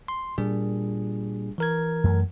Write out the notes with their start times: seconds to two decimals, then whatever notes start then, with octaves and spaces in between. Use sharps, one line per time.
0.08 C6
0.38 A#2 G3 D4 G#4
1.58 E3 A#4 G#6
2.04 F#2 A3